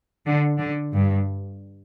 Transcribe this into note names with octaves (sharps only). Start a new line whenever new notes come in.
D3
D3
G2